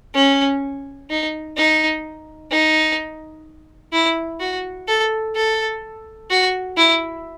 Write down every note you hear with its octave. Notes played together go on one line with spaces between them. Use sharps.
C#4
D#4
D#4
D#4
E4
F#4
A4
A4
F#4
E4